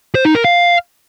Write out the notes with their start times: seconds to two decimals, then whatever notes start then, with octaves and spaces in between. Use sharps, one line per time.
0.15 C5
0.25 D#4
0.35 A#4
0.45 F5